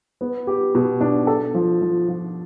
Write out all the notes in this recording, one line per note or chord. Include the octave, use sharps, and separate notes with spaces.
B3
G4
B2
D4
A4
F3
F3
F3